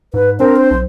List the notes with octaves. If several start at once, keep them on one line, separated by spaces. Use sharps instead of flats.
G#2 B4
C4 D4 A#4
C5
B1